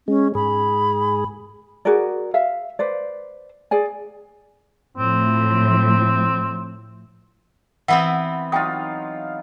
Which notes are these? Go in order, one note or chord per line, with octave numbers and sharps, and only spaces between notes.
G#3 C#4
G#2 G#4 B5
F#4 G#4 A#4 D5
E5 F5
B4 C5 D5
G#4 D5 G#5
A2 F3 C4
E3 B3 C4 E5 F#5
F#3 D#4 F4 G5 D#6